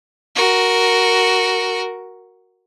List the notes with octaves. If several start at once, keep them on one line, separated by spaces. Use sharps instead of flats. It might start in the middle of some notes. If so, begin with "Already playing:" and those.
F#4 A#4